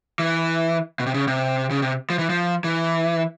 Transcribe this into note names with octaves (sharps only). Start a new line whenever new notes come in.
E3
B2
C3
C#3
C3
C#3
C3
F3
E3
F3
E3